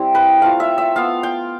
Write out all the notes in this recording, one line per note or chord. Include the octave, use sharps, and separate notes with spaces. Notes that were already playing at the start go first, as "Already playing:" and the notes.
Already playing: G3 C4 E4
B4
A3 C4 F4 F5
E5
E5
B3 F4 F5
G5